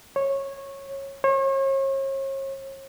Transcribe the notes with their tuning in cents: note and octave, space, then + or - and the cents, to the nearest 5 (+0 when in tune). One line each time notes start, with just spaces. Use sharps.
C#5 -15
C#5 -40